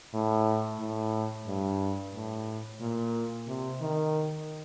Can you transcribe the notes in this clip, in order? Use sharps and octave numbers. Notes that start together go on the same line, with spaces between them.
A2
A2
G2
A2
A#2
C3
D#3